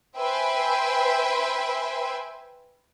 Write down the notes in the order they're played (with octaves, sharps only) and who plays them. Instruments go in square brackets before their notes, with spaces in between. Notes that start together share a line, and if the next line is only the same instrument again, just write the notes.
[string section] B4 C5 E5 G5 G#5 C6